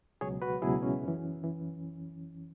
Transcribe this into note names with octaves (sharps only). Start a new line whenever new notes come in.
C#2 B2 F#3 G#4 C#5
F#4 B4
C#2 B2 F#3 E4 G#4
C#4
F#2 E3
E3